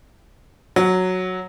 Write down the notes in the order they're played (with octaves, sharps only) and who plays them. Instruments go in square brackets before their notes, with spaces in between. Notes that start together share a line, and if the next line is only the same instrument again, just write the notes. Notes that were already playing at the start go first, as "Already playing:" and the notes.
[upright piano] F#3